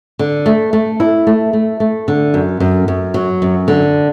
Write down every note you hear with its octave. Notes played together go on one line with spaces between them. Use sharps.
D3
A3
A3
E4
A3
A3
A3
D3
F#2
F#2
F#2
F#3
F#2
D3